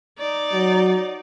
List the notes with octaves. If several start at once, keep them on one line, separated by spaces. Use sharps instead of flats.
D#4 D5
F#3